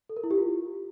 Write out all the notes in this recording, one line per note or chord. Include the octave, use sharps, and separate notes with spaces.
A4
A#4
E4
G4
F4